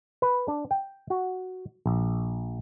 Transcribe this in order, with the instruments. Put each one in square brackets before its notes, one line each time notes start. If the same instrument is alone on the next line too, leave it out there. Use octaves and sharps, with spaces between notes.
[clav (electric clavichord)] B4
D4
G5
F#4
A#1